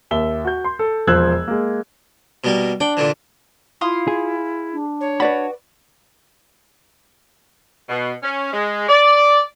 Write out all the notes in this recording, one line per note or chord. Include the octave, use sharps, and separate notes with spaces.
D#2 E5 G7
F#4 G6
C6
A4
E1 F3 C5 E6 F#6 G#6
G#3 A#3
B2 G3 A#3
D4 G5
A#2 D3 E3
E4 F4 F5 C6 D#6
G#4
D4
C#5
F#4 B4 D5 B5
B2
C#4
G#3
D5